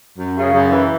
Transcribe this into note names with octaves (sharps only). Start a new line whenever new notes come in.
F#2
C#3
F#2
E3